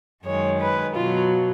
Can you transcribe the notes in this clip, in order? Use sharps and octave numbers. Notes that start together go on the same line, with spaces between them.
F#2 D#3 G#3 C#5
B4
B2 F#3 F4